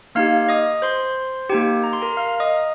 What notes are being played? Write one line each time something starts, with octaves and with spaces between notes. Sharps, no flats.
A#3 D#4 G4 F5 F6
D#5 D#6
C5 C6
A#3 D#4 G4 G5
A#5
C6
A#4 A#5
F5 F6
D#5 D#6